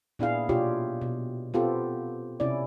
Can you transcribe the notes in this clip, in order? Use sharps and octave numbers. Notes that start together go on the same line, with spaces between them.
A#2 B3 D4 E4 G#4 F5
B2 D4 F4 G4 C#5
B2
B3 C4 F4 G4 A4
C3 C#4 E4 D5